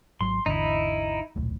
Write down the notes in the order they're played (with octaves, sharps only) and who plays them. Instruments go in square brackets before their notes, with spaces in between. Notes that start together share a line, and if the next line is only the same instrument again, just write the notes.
[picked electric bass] G#1 F#3 [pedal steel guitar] C6
[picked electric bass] G#1 E2 D3 [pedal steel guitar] D#4 E4
[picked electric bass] D#1 B1 A2